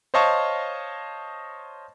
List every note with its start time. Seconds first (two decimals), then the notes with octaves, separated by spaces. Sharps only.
0.14 C5 C#5 D#5 F5 A5 C#6